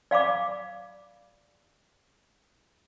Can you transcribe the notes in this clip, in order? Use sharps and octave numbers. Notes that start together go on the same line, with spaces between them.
D5 F5 B5 D6